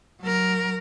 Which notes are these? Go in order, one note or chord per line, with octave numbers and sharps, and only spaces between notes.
F#3 A#4